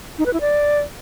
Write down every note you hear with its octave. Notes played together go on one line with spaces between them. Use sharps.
D#4
B4
E4
D5